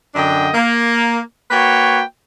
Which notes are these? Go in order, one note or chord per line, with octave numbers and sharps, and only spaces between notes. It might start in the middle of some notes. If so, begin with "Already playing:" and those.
F#2 D3 D4 D#5 G5
A#3
A#3 F#4 B4 C#5 G5